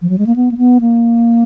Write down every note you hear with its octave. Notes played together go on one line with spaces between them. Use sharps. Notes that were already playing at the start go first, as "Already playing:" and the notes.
F3
F#3
G#3
A#3
B3
A#3
B3
A#3